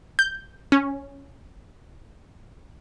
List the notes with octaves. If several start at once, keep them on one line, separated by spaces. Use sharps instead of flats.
G6
C#4